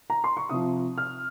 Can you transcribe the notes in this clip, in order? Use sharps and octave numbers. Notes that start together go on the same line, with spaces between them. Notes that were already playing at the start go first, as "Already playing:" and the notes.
A#5
C6
C#6
C3 F3 D#6
F6